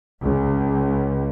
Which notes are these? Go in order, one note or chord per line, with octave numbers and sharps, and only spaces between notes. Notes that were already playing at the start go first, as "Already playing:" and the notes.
C#2